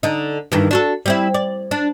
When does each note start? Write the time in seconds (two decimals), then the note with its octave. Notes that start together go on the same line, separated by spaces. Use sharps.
0.03 D3 D#4
0.52 G2 D#3 E3
0.71 D4 F#4 A4
1.06 G3 C4 E4
1.34 D5
1.71 D4